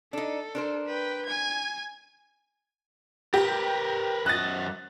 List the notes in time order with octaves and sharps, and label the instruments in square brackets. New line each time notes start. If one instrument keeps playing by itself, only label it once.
[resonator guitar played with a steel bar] D4 D#4 [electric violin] A4
[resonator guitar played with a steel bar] D4 A#4 C5
[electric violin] B4 G5
G#5 G#6
[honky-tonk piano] G4 [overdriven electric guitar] A#4 B4
[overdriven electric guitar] F#2 D#5 [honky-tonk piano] F#6 A6